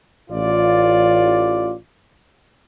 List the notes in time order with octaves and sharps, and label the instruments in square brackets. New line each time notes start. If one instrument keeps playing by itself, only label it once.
[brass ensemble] A1 F4 D5